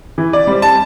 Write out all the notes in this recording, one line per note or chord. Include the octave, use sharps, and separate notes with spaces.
E3
D5
G3 C4
A5